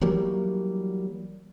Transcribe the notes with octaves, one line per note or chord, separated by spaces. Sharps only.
E3 F#3 G3 A#3